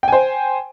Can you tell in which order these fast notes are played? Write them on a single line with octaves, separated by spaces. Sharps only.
G5 G#5 C5